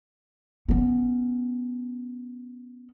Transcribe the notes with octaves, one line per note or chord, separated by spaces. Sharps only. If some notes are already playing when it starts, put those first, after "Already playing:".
B3 C#4